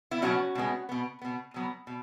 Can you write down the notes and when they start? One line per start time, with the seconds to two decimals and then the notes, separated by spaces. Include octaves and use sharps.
0.11 B3 E4
0.22 B2 F#3 B3 C#4 F#4
0.55 B2 G#3 B3
0.89 B2 B3
1.22 B2 B3
1.54 B2 F#3 B3
1.87 B2